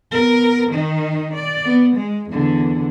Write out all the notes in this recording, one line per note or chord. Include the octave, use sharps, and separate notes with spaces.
B3 A#4
D#3 D#4
D5
B3
G#3
E2 D3